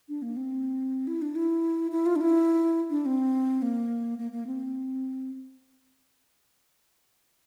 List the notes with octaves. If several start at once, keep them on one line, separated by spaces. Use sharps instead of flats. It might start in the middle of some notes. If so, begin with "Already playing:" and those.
D4
A#3
C4
E4
D4
E4
E4
F4
D4
E4
D4
C4
A#3
A#3
A#3
C4